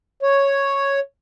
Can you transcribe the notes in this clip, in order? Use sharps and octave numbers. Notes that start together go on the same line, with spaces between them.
C#5